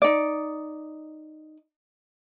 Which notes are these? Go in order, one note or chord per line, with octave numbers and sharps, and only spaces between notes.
D#4 D5